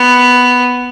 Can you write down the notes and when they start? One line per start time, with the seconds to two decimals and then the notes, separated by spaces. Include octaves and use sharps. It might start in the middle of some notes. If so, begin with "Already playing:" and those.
Already playing: B3